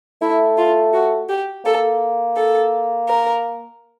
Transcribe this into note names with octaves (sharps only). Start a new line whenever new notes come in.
A3 E4
F4
F#4
G4
A#3 A4
A4
A#4